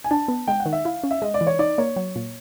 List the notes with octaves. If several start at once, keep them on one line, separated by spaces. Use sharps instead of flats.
G#5
D4 A5
B3
G#3 G5
F#5
D#3
E5
E4 F5
C#4
E5
G#3 D#5
D5
E3
C#5
D#4 D5
A#3 C#5
F#3
A#2